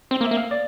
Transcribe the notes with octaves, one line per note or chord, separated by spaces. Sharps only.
C4 C5
A#3
E5
A#3
F5
D5